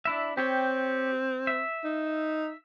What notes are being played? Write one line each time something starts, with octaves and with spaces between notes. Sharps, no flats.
D4 E4 E5
C4 G4 C#5 G5
E5
D#4